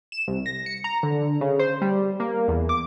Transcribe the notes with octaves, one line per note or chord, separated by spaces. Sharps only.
E7
C2
A#6
C#7
A#5
D3
C#3
C5
G3
A#3
E2
D6